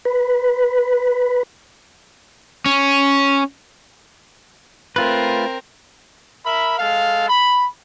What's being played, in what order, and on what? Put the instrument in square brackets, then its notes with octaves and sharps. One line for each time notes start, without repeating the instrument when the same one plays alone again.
[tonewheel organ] B4
[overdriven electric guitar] C#4
[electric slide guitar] A3 F4 B4 [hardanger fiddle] C4 A#4
[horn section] A#4 E5 B5
G#3 A4 F5
B5